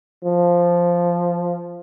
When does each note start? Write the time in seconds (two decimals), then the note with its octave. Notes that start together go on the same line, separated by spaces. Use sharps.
0.24 F3